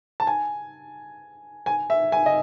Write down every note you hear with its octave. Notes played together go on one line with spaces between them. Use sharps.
A5
G#5
G#5
E5
G#5
D#5